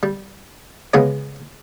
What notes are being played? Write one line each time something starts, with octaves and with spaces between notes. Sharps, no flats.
G3
C#3 G#3 B3 G#4 C#5